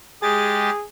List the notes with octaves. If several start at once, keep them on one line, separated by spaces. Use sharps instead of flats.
G#3 G4 G#4 D#6 A6